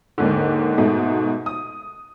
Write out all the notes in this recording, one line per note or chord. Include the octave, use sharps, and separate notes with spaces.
D#2 G#2 D3
G#2 B2 A3
D#6